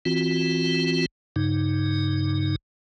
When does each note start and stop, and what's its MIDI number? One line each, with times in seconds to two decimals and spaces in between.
0.05 1.06 52
0.05 1.06 60
0.05 1.06 65
0.05 1.06 66
1.36 2.56 43
1.36 2.56 49
1.36 2.56 63